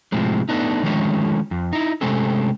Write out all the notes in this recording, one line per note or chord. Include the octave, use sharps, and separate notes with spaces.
A2 C3 F3 G#3
A3 B3 D4 D#4
D3 D#3 F3 G#3 A3 C#4
F2
D#4 E4
C3 G#3 A3 C4 C#4 A4